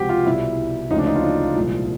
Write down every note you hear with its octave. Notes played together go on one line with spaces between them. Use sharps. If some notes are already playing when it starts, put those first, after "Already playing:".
Already playing: C#2 C3 F3 F#4 G4
F4
C2 B2 G3 E4
D2 C#3 F3 G#3 D#4
D4
D#4
F4
D4
C2 A#2 F3 G#3